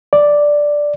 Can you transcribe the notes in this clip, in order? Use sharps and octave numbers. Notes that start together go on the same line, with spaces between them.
D5